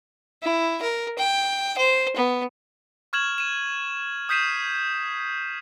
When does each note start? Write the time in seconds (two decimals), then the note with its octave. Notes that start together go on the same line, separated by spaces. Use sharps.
0.42 E4
0.82 A#4
1.18 G5
1.77 C5
2.16 B3
3.13 C#6 F6 G#6 E7 F#7
3.38 D#7 E7
4.29 D#6 G6 B6 C7 D#7 E7